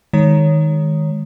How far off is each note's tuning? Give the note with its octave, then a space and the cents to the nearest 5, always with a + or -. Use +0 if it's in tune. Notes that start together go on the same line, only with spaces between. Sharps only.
D#3 +0 G#3 -5 C#5 +0